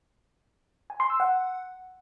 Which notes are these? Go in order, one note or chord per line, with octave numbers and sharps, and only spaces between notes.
G#5
C6
E6
F#5